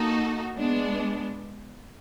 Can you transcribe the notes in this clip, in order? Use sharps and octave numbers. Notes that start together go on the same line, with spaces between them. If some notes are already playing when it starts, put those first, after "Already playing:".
Already playing: A#3 D#4 F#4 A4
G#3 B3 D4